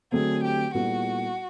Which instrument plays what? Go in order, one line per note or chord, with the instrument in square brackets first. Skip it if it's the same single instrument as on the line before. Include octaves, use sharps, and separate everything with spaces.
[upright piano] D3 F#3 A3 C4 [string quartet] G#4
[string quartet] G4
[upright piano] A#2 G3 B3 E4 A4 [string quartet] F#4